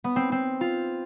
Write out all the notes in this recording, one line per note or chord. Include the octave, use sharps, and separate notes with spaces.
B3
C4
C4
F4